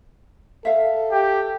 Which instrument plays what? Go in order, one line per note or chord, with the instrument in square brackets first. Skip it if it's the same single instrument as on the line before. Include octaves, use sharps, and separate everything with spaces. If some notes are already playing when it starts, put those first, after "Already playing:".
[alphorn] A4 [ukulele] E5 F5
[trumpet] G4